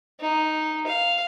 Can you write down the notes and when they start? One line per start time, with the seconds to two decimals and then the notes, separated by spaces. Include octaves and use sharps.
0.21 D#4
0.87 F5